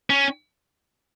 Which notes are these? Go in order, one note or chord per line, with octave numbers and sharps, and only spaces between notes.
C#4